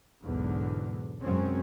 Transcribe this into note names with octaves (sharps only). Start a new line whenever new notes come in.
B1 E2 G#2 D3
F#2 C3 G#3 C4 C#4